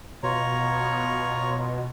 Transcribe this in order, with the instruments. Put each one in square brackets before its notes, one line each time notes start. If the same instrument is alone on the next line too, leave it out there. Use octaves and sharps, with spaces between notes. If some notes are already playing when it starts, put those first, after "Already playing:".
[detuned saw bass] B2 [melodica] F4 C#5 A#5